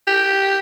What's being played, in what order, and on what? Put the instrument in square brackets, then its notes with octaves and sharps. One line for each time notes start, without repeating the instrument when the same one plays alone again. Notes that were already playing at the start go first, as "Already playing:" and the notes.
[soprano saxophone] G4